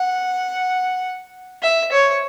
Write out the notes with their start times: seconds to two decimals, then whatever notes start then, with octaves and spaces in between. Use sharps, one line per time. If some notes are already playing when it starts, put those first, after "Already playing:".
Already playing: F#5
1.62 E5
1.92 C#5